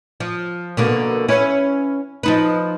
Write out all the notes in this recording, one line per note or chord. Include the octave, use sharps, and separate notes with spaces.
F3
B2 D3 A#3
C#4 E4 B4
F3 D#4 B4